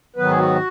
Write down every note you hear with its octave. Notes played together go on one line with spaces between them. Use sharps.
G#2 D#3 F#3 B3 B4
G#4
F#4